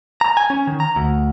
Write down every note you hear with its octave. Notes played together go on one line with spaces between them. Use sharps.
A#5
G#5
C#4
D#3
A#5
D2